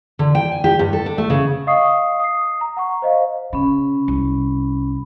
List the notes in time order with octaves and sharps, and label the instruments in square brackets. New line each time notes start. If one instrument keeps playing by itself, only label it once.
[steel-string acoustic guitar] D3
G5
G#5
G4
G2
A4
D4
A3
C#3
[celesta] D#5 F5 C#6 D#6 C7
D#6 C7
A#5
F#5 A#5 C#6
C5 D#5 F5
[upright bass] C#3 [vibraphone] C#4 B5
[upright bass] C2